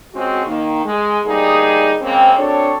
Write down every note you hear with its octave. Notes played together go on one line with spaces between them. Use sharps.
G#3 C4 C#4 F#4
D#3 A#3
G#3
D2 G3 A#3 D#4 G#4
C#3 G#3 A#3 C4
C4 D4 F#4 A4 C#5